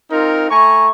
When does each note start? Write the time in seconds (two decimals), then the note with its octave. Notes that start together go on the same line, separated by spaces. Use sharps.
0.11 C4 D#4 F4 A#4
0.50 A3 G#5 A#5 C#6